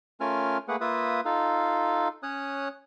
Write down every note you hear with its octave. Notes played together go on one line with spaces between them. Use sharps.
A3 C#4 F4 A#4 G#5 F6
A3 A#3 G#4 B4 F#5
A#3 F4 B4 E5 D#6
D#4 F4 A4 F5
C#4 C#5 D#6 F#6